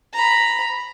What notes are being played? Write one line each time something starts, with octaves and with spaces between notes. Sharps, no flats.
A#5 B5